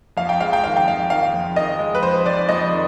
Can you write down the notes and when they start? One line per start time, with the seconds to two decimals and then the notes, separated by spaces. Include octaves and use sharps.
0.17 F2 F5
0.29 G5
0.40 G#3 F5
0.53 G5
0.63 D#3 F5
0.77 G5
0.86 F2 F5
1.10 D#3 F5
1.34 F2
1.56 D#3 D#5
1.79 G#3
1.95 B4
2.03 F2 C5
2.26 F2 D5
2.49 F2 D#5
2.73 D#3